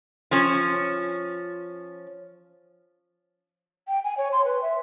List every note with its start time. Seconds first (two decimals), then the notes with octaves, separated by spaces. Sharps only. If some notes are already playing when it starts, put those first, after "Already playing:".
0.31 F3 C#4
3.88 G5
4.04 G#5
4.18 C#5
4.32 C6
4.45 B4
4.62 E5